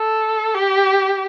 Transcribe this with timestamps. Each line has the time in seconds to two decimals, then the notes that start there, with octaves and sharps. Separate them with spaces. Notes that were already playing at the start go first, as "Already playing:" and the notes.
Already playing: A4
0.55 G4